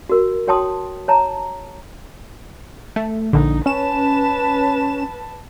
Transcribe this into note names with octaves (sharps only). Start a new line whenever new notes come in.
F#4 A#4
F#4 C#5 G5 A5 C6 D#6
C#5 A5 A#5
A3
A#1 D3 D#4
C#4 B4 A5 E7